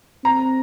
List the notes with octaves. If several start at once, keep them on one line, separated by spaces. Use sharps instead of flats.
C4 A#5